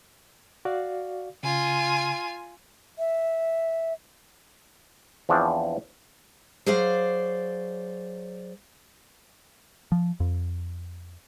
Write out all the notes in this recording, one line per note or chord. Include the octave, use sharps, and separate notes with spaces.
F#4 D5 F5
C#3 F4 G#5
E5
E2 F3 C4 D4 C#5
F#3 G#4 C5 D5 F5
F3
F2